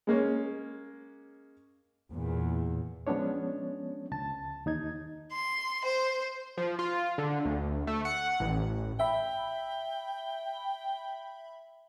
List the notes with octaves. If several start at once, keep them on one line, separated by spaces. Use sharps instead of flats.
G#3 A#3 C#4
E2 A#2
F3 G#3 B3 C#4 D4 C#5
C#2 A5 A6
D#2 D#4 G#6
C6
C5
F3
F4
D3
D2
A3
F#5
A1
E5 G5 B5